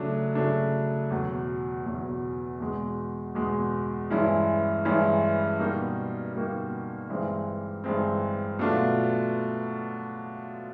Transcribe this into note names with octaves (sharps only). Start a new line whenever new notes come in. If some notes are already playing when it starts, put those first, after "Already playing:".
Already playing: C#3 F#3 A3 D4
C#3 F#3 A3 D4
E2 B2 F#3
E2 B2 F#3
E2 B2 G#3
E2 B2 G#3
G2 E3 G#3 C#4 E4
G2 E3 G#3 C#4 E4
B2 G3 A#3 D#4 F#4
B2 G3 A#3 D#4 F#4
G2 E3 G#3 C4
G2 E3 G#3 C4
B2 F#3 A3 D4 F4